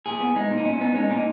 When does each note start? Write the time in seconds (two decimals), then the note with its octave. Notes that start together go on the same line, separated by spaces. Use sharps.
0.06 A#2 G#4
0.20 B3
0.36 G#3 D#4
0.51 A#2
0.57 D#4
0.65 A#2 C#4
0.81 B3 D#4
0.95 G#3 C#4
1.10 A#2 D#4